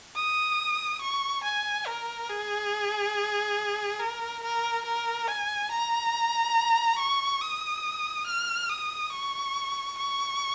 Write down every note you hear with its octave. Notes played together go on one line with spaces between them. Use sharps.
D#6
C#6
G#5
A#4
G#4
A#4
A#4
A#4
G#5
A#5
C#6
D#6
F6
D#6
C#6
C#6